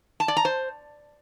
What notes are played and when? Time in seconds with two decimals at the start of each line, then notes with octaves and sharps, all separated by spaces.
0.20 A5
0.28 D5
0.37 A#5
0.45 C5